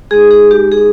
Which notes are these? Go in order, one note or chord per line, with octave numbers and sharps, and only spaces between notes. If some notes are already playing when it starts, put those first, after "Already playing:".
G#3 D#4 G#4
G#4
G4
G#4